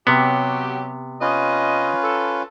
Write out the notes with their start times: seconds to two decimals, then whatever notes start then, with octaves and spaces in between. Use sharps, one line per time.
0.07 C3 F#3 B3 C#4 G4
1.21 C#4 F4 B4 D#5
2.02 A4